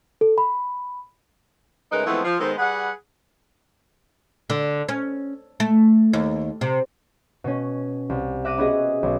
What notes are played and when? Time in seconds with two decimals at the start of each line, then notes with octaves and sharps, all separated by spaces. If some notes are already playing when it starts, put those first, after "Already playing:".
0.21 A4
0.38 B5
1.92 C#3 G#3 A3 D#4 A#4 B4
2.06 E3 F3 G#3 A3 B3 C4
2.24 F3
2.39 D#3 G#3 B3 A4 C5
2.58 G3 G#4 B4 F#5
4.50 D3
4.89 C#4
5.60 A3
6.13 D#2
6.61 C3
7.44 B2 C#4
8.10 C2
8.45 E5 D6 F#6 A#6 D#7
8.58 B3 C#4 F#4 G#4 D#5
9.03 B1 B2